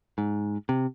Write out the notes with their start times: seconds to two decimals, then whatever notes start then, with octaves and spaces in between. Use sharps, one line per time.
0.18 G#2
0.69 C3